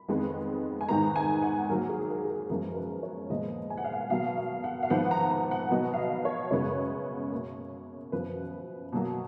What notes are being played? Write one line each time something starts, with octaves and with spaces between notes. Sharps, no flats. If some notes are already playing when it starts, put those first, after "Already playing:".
Already playing: B5
F2 D#3 G#3 B3
G#5
G#2 D#3 G#3 B3 A#5
G#5
F#5
G#2 F#3 A#3 A#4
G#4
A#4
G#4
A#4
F#2 F3 G#3 B3 A#4
A#4
B4
C#5
A#2 F3 G#3 B3 D#5
G#5
F#5
F5
F#5
B2 F#3 B3 F5
F5
F#5
F5
G#2 F3 B3 F#5
A#5
A#5
F#5
B2 F#3 B3 D#5
F5
D#5
C#5
F#2 C#3 G#3 B3 C#5
B2 A#3
F#2 F3 B3 B4
B2 F#3 A#3